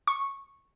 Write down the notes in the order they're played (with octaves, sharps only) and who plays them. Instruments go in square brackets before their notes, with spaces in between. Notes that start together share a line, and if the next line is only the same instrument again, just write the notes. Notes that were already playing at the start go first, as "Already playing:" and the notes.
[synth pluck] C#6